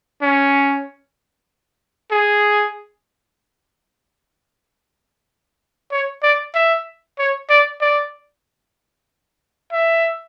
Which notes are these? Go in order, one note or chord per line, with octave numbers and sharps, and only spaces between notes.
C#4
G#4
C#5
D5
E5
C#5
D5
D5
E5